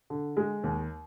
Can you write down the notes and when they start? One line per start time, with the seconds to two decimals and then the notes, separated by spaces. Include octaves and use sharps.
0.10 D3
0.37 G#3
0.64 D#2